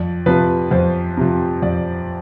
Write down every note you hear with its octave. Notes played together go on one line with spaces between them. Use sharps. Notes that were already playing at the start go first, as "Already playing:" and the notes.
Already playing: F2 D5
C3 F3 B4
F2 C5
C3 F3
F2 D5